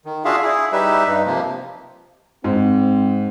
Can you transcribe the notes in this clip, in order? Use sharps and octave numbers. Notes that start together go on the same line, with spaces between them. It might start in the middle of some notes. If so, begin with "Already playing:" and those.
D#3
D4 F4 F#4 G#4 E5 F5
E4 G#4
G3 D#4 G4 B4 E5
G2 D#4
C3 F3 A#3
G#2 C4